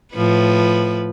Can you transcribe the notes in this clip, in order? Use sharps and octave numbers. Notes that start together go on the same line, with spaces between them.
A2 F3 B4